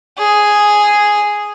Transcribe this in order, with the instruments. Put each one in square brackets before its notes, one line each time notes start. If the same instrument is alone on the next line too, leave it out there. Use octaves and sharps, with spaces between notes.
[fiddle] G#4